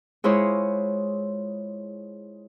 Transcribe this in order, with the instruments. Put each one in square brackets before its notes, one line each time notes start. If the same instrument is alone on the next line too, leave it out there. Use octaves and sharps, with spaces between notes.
[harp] G#3 E4 F4 C5 C#5 D#6